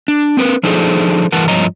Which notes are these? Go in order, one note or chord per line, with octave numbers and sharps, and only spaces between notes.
D4
C4 A#4 B4
F3 D4 D#4 G#4 A4 C5
G2 E3 A#4 B4 F#5 A5
G2 A#2 F3 C#5 D#5 A#5